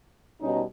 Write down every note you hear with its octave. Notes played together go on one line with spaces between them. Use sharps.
B2 G3 C#4 D#4